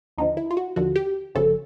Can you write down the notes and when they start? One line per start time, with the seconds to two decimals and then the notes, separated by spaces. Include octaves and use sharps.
0.18 D#2 D3 F3 D#4
0.37 E4
0.51 F4
0.57 F#4
0.76 D#2 D3 F3 F#4
0.96 G4
1.35 G1 F#2 C#3 F3 A4